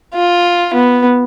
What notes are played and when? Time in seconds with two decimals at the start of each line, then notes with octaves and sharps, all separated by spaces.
0.15 F4
0.74 B3